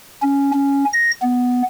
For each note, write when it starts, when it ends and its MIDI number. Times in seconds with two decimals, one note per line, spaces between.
0.22 0.52 61
0.53 0.85 61
0.93 1.11 94
1.22 1.62 59